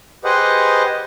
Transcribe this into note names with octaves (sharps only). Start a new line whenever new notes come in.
G4 G#4 B4 C5 D#5 F#5